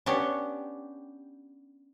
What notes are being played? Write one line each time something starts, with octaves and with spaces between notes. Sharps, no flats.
B3 C#4 D4 G4